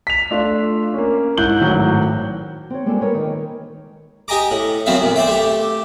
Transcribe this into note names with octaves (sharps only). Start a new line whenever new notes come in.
B6 F7
A3 D4 F4
A#3 C#4
G#2 E4 F#6 G6 F#7 G7
G#1 A2 F#3
C4 C#5
G3 G#3 A#3 C4 F4 A4
A#4 B4 C#5
D#3
G4 D#5 G#5 A#5 D6
A2
F#2 F#3 B3 C4 E5 F5
D2 A#2
C5 D5 E5 G5
A3 G4